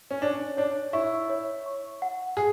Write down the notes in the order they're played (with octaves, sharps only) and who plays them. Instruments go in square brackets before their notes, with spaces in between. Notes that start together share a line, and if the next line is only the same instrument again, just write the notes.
[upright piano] C#4
[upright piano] D4 [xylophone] C#5
[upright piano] D4 [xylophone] C#5
[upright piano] E4 [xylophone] C#6
[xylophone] C#5
C#6
F#5
[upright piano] G#4